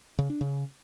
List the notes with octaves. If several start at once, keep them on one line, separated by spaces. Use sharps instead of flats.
C#3
D4
C#3